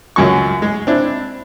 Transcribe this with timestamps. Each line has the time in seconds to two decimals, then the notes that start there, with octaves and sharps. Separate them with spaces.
0.16 C#2 F#2 F#4 C#6
0.62 G#3 G#4
0.87 C4 D4 E4